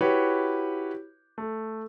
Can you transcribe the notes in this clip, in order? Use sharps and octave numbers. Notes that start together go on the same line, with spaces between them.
E4 F#4 G4 B4 C#5
A3